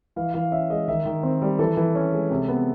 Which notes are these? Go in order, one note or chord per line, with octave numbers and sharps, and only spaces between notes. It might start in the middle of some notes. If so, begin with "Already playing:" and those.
E3 F5
E3 F5
C#4 E5
G#3 D#5
D#3 E5
D#3
C4
G3
E3 A4
E3
C#4
G#3
C3
B3